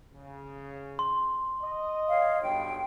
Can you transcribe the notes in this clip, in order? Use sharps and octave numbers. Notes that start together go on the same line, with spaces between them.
C#3
C6
D#5
C#5 F5
B1 G2 G5